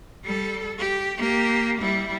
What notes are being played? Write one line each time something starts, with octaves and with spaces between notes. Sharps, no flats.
G3 A4
G4
A#3 G4
G3 E4